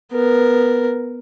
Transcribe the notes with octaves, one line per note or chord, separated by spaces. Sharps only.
B3 A#4